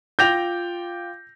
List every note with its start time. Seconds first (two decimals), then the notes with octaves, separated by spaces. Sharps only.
0.19 F4 G5 D6 G6 A#6 F7